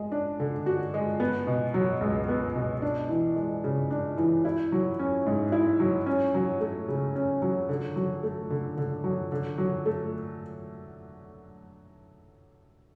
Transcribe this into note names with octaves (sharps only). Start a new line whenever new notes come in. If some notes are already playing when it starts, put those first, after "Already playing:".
Already playing: G#3
D4
D3
F#4
G#3
B3
B2
F#3
C#2
B3
B2
D4
E3
G#3
C#3
D4
E3
E4
F#3
C#4
G#2
E4
F#3
C#4
F#3
A3
C#3
C#4
F#3
D3
F#3
A3
D3
D3
F#3
D3
F#3
A3